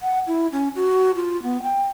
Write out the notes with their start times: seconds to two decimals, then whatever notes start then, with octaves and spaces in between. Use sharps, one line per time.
0.01 F#5
0.27 E4
0.52 C#4
0.75 F#4
1.15 F4
1.43 B3
1.63 G5